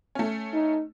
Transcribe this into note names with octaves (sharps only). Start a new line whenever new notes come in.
A3 C#4
D#4